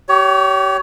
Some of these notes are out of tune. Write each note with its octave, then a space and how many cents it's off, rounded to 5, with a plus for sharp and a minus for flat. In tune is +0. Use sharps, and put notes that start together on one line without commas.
G4 -30 C#5 +25